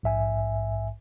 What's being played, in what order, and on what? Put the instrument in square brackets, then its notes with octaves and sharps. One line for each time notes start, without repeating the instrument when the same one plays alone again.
[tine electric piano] A#1 G#2 E5 G#5